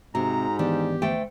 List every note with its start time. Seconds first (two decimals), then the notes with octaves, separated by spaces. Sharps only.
0.15 G#2 C3 F#4 A#5
0.59 D#3 E3 B3 D4 G4
1.02 D2 A3 G5